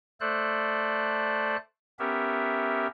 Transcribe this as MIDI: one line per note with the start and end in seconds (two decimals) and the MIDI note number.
0.20 1.56 57
0.20 1.56 69
0.20 1.56 72
0.20 1.56 74
0.20 1.56 90
1.99 2.87 59
1.99 2.87 61
1.99 2.87 67
1.99 2.87 70
1.99 2.87 76